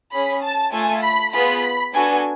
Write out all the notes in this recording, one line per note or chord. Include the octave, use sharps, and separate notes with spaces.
C#4 G#4 B5
A5
A3 F4 A4 G#5
B5
B3 F4 G#4 B5
B3 D4 F#4 A4 G#5